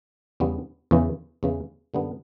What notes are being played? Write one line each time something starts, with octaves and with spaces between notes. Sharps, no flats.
E2 C#3 G3 B3
E2 C#3 E3
E2 C#3 E3
F#2 D3 G3 B3